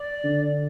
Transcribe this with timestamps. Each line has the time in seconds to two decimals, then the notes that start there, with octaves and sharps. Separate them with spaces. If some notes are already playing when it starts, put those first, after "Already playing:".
Already playing: D5
0.24 D3